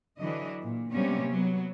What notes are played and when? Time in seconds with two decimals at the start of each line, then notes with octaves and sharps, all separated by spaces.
0.21 D3 E3 F#3 D4 D#5
0.62 A#2
0.92 C3 F#3 G3 A#3 B3 C#4
1.29 F#3 B3